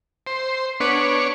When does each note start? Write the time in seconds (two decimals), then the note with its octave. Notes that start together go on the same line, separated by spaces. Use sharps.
0.27 C5
0.80 B3 D4 B4 C#5